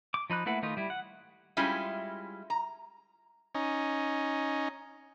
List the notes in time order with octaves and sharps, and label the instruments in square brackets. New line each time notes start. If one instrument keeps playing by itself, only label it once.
[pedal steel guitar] D6
F3 D#4 B5 F#6
A3 A#3 E4 B4 F#5
D#3 A3 D#4 F4 B4
G3 E4
F#5
[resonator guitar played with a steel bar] G3 G#3 C#4 E4 F4
A#5
[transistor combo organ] C#4 D#4